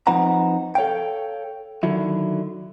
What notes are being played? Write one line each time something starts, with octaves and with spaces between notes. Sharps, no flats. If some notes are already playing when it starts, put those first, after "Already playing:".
F3 C4 D#4 B4 F#5 A#5
A4 C#5 F5 G5
D3 D#3 F#3 E4